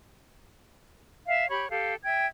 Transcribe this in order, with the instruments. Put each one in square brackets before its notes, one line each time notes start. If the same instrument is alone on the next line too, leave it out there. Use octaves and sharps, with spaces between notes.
[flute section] E5 F5
G4 C#5 B5
G4 A4 F5
E5 G5 G#6